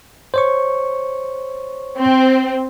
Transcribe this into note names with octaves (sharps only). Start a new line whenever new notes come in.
C5 C#5 C#6
C4